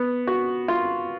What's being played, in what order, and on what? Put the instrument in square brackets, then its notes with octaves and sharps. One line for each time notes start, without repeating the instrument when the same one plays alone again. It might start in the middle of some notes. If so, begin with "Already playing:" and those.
Already playing: [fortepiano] B3
F#4
F4